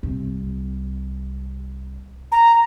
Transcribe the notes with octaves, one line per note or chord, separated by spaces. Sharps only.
C2 C4
A#5